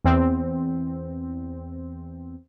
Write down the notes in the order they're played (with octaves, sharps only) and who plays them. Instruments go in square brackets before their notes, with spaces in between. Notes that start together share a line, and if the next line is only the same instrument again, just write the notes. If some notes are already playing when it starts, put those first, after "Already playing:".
[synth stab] E2 C4